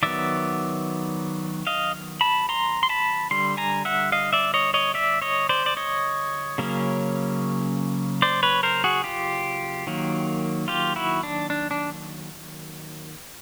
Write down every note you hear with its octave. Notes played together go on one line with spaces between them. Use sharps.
D#3 F#3 B3 D5 E5
D#5 F5
A5 B5
A#5 C6
C6
A5 B5
D3 G3 C6
G#5 A#5
E5 F#5
D#5 F5
D5 E5
C#5 D#5
C#5 D#5
D5 E5
C#5 D#5
C5 D5
D5
C#5 D#5
C#3 F#3 A#3 C#4
C5 D5
B4 C#5
A#4 C5
F#4 G#4
F4 G4
D#3 F#3 A#3
F4 G4
E4 F#4
D4
D4
D4